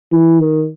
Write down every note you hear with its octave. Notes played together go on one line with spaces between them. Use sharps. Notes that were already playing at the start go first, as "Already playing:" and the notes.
E3
D#3